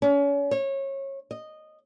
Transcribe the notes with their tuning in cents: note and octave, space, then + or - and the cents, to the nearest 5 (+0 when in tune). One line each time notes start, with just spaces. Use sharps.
C#4 +35
C#5 -25
D#5 -10